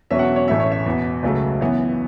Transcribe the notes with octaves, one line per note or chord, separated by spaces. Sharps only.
E1 E2 B2 F#3 C#4 E5
F#5
E5
C#5
A1 A2 A3 C#4 E5
C#5
E5
E2 B2 B3
C#2 C#3 F#3 A3
F#2 E3 B3